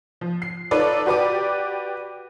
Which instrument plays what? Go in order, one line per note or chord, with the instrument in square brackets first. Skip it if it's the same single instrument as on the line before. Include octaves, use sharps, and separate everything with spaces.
[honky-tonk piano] F3
C7
D#4 F4 A4 B4 C#5 D5
F#4 G4 B4 D5 D6